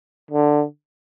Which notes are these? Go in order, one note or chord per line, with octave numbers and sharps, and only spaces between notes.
D3